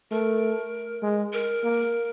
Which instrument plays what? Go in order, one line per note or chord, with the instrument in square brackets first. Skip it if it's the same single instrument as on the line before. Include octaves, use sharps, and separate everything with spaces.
[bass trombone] A3 [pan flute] A#4
[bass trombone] G#3
[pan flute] A#4
[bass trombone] A#3